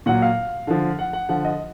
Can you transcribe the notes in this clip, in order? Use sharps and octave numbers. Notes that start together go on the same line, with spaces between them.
A#2 F#3 F#5
F5
D3 F3
F#5
F#5
D3 F3 F#5
D#5